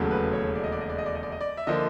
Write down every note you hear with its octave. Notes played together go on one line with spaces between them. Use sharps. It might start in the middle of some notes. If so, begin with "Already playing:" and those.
Already playing: E1 D#2 C#3 F#3 A3
B4
C#5
D5
D#5
D5
D#5
D5
D#5
D5
D#5
D5
D#5
D5
E5
D3 F3 A#3 D#5